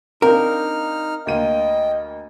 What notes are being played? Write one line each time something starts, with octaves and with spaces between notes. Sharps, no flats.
C4 D4 D#4 F4 A#4 F6
D2 A#3 D#5 G5 D#7